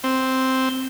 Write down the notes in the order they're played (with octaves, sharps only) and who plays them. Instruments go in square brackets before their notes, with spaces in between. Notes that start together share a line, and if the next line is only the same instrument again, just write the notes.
[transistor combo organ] C4